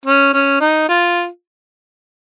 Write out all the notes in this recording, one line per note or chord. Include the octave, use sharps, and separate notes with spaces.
C#4
C#4
D#4
F4